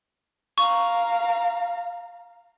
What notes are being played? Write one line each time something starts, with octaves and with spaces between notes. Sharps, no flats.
F5 A#5 C#6